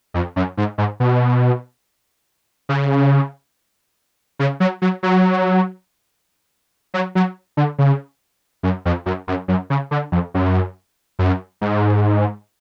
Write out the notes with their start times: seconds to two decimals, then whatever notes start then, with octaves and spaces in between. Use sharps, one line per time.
0.14 F2
0.36 F#2
0.57 G#2
0.78 G#2
1.00 B2
2.69 C#3
4.39 C#3
4.60 F#3
4.82 F#3
5.03 F#3
6.94 F#3
7.15 F#3
7.57 D3
7.78 C#3
8.63 F#2
8.85 F2
9.06 F#2
9.28 F#2
9.48 F#2
9.70 C#3
9.91 D3
10.12 F2
10.34 F#2
11.19 F#2
11.61 G#2